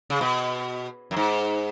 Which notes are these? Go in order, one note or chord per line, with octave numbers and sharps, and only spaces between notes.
C#3
B2
F#2
G#2